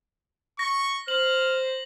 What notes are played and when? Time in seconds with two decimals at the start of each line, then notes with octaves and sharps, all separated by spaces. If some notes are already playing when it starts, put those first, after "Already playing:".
0.59 C#6 A#6
1.08 C5 F6 F#7